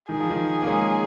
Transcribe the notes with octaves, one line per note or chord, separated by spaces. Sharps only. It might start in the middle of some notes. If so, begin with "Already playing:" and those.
D#3 G#4
F3
D#3
A#3
G#3 C#4